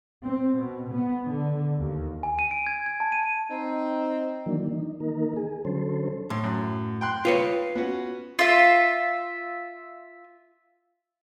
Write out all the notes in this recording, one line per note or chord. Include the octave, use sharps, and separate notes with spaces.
C4
B2
B3
D3
D#2
G#5
D#7
D7
G#6
G#6
A5
D#7
C4 D#4
D#3 E3 F#3 A#3 D4
D#4
D#3 A#3 D#4 A#4
G#4
D3 F#3 C#4 A4 C5
A2 C6
F#2
G5 C6 F#6
F4 B4 C#5
B3 C#4 F#4
F4 E5